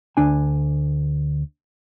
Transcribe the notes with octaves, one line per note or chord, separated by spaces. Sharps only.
D2 D4 G#5